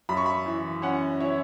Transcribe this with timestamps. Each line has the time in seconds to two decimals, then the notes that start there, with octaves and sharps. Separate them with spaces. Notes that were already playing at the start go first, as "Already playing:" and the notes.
0.09 F#2 B5
0.17 C#6
0.26 B5
0.46 E3
0.82 C#4 F#5
1.20 E4 C#5